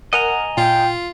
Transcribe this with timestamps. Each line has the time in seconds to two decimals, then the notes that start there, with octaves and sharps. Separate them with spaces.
0.13 A#4 D#5 F#5 G#5 A#5
0.57 A#2 F4 G5